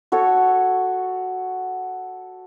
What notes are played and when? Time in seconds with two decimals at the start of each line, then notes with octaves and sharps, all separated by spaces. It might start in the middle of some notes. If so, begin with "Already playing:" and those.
0.12 F#4 A4 C#5